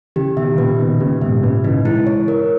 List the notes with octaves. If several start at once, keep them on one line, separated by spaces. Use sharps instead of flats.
C#3 E3 G4
B2 D#3 E5
A#2 C#3 B4
B2 D#3 D#4
A#2 C#3 G4
G#2 B2 E5
A#2 C#3 B4
C#3 E3 D#4
E3 G#3 E4
C#5
A#4